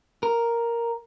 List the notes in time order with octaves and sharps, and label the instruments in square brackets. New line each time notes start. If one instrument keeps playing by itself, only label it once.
[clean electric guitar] A#4